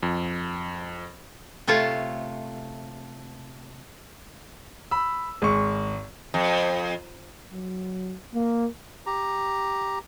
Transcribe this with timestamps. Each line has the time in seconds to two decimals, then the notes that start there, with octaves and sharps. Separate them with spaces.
0.03 F2
1.67 C3 A3 F4 C#5 A5
4.91 B5 E6
5.42 G#1 G#3 C#6
6.34 F2
7.52 F#3
8.34 A#3
9.06 G4 A#5